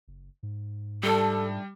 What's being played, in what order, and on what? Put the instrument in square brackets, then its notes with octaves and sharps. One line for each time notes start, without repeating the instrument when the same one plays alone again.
[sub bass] F#1
G#2
[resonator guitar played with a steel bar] F3 A3 D4 [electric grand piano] G3 [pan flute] A4